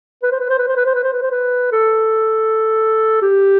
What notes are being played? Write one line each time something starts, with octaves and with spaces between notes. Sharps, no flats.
B4
C5
B4
C5
B4
C5
B4
C5
B4
C5
B4
C5
B4
A4
G4